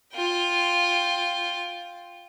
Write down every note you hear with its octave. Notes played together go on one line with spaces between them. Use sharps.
F4 G5